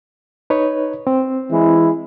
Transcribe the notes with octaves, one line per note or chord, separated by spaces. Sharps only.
D#4 B4 C#5
C4
E3 G#3 E4